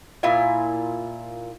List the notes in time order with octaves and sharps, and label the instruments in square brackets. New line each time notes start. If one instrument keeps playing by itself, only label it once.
[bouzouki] A#2 E4 F4 G#5